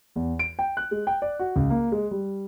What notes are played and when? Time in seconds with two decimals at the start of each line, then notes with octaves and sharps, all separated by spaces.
0.16 E2
0.39 D7
0.59 G5
0.77 F#6
0.91 G#3
1.07 G5
1.22 D5
1.39 F#4
1.56 C#2
1.70 A#3
1.92 G#3
2.11 G3